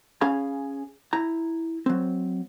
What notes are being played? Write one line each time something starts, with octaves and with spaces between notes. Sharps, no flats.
C#4 G#4 F5 B5
E4 A#5
F#3 C4